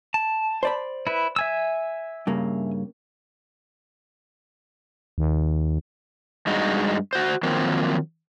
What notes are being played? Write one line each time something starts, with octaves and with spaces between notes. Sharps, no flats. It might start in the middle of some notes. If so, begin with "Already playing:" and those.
A5
C5 D5 B5
E4 B4
E5 G#5 E6
G2 C#3 A#3
D#2
G2 G#3 D#4 F#4
F#4 C5
D#3 F3 F#3 A#3 C4